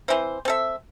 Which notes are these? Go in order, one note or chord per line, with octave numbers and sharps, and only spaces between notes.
E3 C4 E4 C5
C4 A4 E5